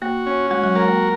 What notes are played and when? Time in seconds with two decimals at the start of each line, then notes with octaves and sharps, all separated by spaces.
0.02 A#3 F#4
0.26 C#4
0.51 G#3 F#4
0.64 F#3
0.76 G#3 A#4
0.88 A#3